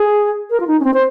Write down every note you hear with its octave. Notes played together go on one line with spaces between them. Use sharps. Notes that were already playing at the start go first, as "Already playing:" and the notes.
Already playing: G#4
A#4
F4
D#4
C#4
C4
C5